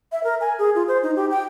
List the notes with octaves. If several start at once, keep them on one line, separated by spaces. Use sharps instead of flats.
E5
A#4
G#5
G#4
F4
C5
D#4
G4
G5